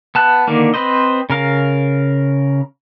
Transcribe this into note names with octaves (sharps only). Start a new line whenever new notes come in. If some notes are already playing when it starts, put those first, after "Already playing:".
B3 A5 F#6
D3 D#3 A#3
C4 B4 C5 D#5
C#3 A#4 F5